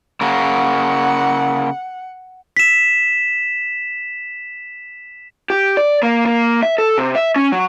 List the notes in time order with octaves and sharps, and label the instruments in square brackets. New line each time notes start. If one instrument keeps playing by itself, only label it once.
[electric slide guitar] C#3 A#3 [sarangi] F#5
[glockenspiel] B6 E7
[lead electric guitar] G4
D5
A#3
A#3
E5
A4
C3
E5
C#4
F#3